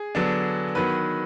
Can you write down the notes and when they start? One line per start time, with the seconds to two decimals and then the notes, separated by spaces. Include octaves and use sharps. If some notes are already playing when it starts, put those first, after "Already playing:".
Already playing: G#4
0.15 D3 F#3 B3 D4
0.75 D#3 F#3 B3 B4